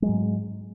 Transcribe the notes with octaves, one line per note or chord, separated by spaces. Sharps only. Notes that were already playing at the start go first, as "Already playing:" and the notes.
G#2 F#3 G#3